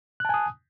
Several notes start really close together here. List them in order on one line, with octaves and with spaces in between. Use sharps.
F#6 A5 G#5 D#6